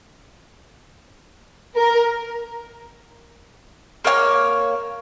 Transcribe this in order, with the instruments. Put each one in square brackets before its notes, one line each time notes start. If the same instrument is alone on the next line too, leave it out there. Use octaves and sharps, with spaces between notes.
[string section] A#4
[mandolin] A#3 C#5 F#5 F6